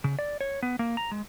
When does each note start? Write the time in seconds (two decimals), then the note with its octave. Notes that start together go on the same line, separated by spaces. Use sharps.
0.04 C#3
0.19 D5
0.41 C#5
0.63 B3
0.79 A#3
0.97 A#5
1.11 G#3